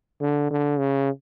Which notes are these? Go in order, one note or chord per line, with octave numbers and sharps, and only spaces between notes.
D3
D3
C#3